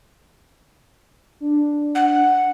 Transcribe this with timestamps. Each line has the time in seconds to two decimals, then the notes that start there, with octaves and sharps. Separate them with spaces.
1.40 D4
1.95 F#5